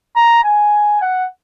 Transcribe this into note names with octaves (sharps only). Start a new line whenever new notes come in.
A#5
G#5
F#5